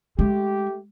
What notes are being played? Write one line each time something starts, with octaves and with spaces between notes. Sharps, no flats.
G#3 A3 G4